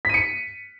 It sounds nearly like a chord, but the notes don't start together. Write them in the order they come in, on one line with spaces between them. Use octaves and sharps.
B6 D#7 C#7